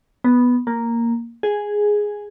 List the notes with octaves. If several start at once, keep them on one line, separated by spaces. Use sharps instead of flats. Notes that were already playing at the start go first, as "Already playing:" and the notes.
B3
A#3
G#4